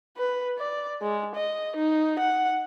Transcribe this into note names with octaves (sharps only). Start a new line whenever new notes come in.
B4
D5
G#3
D#5
D#4
F#5